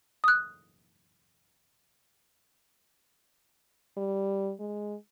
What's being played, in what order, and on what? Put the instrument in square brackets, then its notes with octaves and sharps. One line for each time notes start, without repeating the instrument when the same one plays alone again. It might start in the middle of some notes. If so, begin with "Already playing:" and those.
[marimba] D#6 F#6
[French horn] G3
G#3